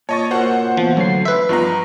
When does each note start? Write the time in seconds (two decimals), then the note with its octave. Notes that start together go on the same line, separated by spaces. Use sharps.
0.09 A#2 C#5 D#5 A5 C#6 A6
0.31 A#2 A#3 F#4 C5 C#5 F#5
0.77 E3 F3 B3
0.97 D2 F#3 C#5 C7
1.25 B4 E5 C6
1.49 G2 F3 B3 D#4 A#5